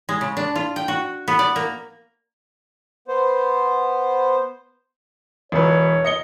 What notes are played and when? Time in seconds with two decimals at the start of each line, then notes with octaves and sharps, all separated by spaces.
0.09 G#3
0.21 C#3
0.37 D4
0.56 F4
0.76 G5
0.88 F#4
1.28 B3
1.39 D5
1.56 A#3
3.08 B3 C5
5.52 E1 B4 C#5
6.05 D#5 C#7 G7